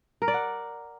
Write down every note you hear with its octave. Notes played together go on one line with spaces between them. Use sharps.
A#4
D5
F#5